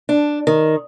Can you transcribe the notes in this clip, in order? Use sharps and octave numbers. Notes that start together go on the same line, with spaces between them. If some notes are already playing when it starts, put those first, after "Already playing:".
D4
D#3